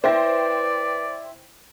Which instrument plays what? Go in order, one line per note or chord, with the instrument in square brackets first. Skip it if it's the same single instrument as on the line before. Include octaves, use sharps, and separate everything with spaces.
[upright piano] E4 [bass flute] B4 [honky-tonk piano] C5 G5 A#6 [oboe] D5